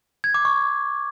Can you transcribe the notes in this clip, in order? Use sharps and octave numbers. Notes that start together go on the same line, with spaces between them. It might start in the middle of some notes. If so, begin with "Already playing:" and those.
G#6
D6
C#6